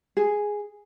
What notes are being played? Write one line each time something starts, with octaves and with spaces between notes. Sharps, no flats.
G#4